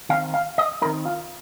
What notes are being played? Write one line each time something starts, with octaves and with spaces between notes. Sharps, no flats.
D#3 C4 D#4 F5
F5
D#5
D#3 C4 D#4 A#4
F4